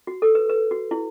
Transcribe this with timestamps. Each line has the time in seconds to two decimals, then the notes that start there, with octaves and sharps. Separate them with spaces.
0.07 F#4
0.22 A4
0.35 B4
0.49 B4
0.71 F#4
0.91 E4